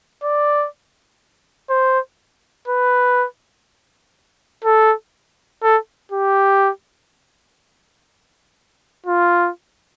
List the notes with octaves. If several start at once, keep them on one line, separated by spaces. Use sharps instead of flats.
D5
C5
B4
A4
A4
G4
F4